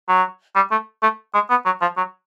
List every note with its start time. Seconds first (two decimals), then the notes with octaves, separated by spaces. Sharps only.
0.09 F#3
0.56 G3
0.72 A3
1.03 A3
1.34 G#3
1.50 B3
1.66 F#3
1.82 F3
1.97 F#3